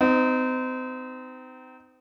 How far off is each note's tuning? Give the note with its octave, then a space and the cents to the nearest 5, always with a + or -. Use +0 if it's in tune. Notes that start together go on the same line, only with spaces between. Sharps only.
C4 -35 D#4 +0